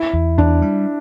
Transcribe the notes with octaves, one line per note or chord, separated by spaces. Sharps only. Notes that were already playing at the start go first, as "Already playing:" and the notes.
Already playing: E4
E2
E2 D4
G3